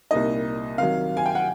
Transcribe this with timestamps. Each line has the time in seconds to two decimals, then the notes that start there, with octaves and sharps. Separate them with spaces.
0.11 C2 A#2 G3 A#3 D#4 D#5
0.78 C3 D#3 F#3 F5
1.17 G#5
1.26 G5
1.35 F#5